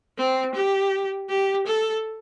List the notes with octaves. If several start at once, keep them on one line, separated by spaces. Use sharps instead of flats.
C4
G4
G4
A4